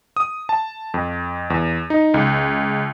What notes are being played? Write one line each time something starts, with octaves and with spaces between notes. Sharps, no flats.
D#6
A5
F2
E2
D#4
C#2